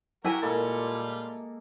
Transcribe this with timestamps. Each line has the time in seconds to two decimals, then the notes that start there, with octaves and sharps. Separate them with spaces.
0.25 E4 F#4 G4 A#4 G#5
0.42 A#2 G3 G#3 A#3 F4 A4